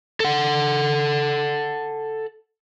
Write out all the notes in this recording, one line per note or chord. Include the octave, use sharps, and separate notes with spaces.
A4 F#5